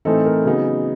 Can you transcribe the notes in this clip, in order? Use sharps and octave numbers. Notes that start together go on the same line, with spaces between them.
A2 E3 A3 C4 D#4 A4
A#4
C#3 F#3 B3 D#4